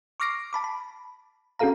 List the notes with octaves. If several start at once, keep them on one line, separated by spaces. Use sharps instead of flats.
C#6 D6 F6 A#6 C7 D7
A5 B5 D6
B5
C#4 F#4 G#4 A4 F5 A#5